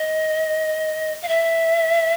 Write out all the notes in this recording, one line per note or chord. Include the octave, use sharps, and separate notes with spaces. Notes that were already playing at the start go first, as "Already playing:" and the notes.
Already playing: D#5
F5
E5